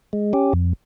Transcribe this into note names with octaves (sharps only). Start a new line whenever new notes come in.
G#3
C#4 G4
F2